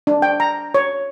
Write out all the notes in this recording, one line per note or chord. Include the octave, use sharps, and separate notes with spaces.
D4
G5
A#5
C#5